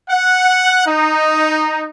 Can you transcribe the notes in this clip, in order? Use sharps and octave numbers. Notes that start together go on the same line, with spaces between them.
F#5
D#4